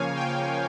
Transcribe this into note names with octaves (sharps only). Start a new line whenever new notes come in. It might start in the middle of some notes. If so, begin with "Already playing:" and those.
Already playing: C#3 F3 A#3 C#5 F5 G#5
G5